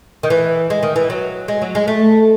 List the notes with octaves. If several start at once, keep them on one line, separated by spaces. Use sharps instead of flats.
D#3
E3
G#3
D#3
E3
F#3
G#3
F#3
G#3
A3